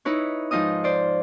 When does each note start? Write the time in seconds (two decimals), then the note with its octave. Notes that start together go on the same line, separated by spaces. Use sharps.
0.05 D#4 E4 B4 C#5
0.51 G#2 F3 D#4 F4 D#5 D#6
0.84 C5 D5